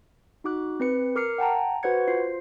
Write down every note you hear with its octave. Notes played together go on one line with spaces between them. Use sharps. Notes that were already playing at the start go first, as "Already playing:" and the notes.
D#4 F#4 D6 F#6
C4 B4 C#7
A#4 D6 F6 C7 C#7
F#5 G5 A5 A#5
F#4 B4 C5 F#5 G#6 C#7
F4 C5 C7